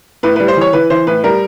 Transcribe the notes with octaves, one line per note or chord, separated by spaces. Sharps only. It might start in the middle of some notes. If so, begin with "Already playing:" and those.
A2 B4
B4
G3
C5
E3 C#5
E3 B4
E3 C5
A2 B4
G3 A#4